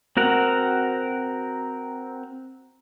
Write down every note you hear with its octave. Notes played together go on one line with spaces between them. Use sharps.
C4 F#4 A#4 F#5